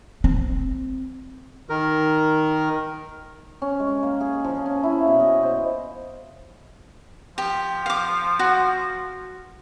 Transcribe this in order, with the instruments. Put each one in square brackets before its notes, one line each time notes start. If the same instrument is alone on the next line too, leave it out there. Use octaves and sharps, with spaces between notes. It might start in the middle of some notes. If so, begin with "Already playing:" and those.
[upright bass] C4
[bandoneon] D#3 A#4
[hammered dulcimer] C#4
G#3
A#3
G#4
F3
C#4
E4
B2
D#5
C5
[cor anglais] F3 [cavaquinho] G4
[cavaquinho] F5 D6
F#4